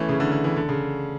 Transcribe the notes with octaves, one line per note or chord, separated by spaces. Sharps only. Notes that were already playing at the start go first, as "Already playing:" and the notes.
Already playing: E3 A3 C#4
C#3
D3
D3
E3
D3
C#3